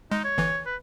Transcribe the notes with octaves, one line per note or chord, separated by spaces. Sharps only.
G#3 D#4
C#5
G1 E3
B4